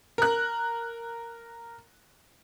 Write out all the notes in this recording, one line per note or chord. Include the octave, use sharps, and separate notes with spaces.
A#4 F#6